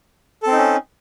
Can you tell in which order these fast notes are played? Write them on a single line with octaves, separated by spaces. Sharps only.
A4 C4 D#4 C#4